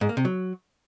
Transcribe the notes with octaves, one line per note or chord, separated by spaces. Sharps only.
G#2
A#3
C3
F#3